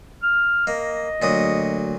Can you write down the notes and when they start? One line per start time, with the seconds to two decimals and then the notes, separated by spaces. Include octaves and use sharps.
0.23 F6
0.67 A#3 D#5
1.22 D2 A#2 F#3 D#6